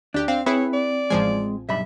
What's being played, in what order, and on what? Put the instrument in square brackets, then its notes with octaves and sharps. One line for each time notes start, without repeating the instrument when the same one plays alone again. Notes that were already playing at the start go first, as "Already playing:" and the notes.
[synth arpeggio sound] D2 G4 [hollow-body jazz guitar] D4
[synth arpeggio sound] C4 [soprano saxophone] F5
[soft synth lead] C4 [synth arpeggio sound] E4 G#4 [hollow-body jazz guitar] B4 [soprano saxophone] C#5
[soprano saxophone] D5
[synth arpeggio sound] A1 F3 G#5 [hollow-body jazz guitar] G#3
[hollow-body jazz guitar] B1 G2 B5 [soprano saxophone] E5